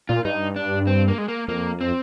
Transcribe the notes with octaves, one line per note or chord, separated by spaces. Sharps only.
A#2 F4
G2 D#4
D4
C4
A#3
G#3
A#3
F2 A#3
C4